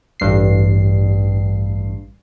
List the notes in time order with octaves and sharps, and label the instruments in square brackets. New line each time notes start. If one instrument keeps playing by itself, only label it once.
[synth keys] A1 G2 C7